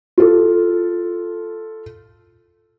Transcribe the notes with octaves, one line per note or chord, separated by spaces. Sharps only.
F4 A4